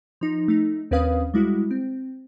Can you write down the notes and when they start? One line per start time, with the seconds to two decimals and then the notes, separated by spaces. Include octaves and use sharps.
0.21 F3 D#4
0.48 A3 D#4
0.91 D#2 C4 C#4 B4 F5 D#6
1.34 G3 G#3 E4 F#4
1.71 C4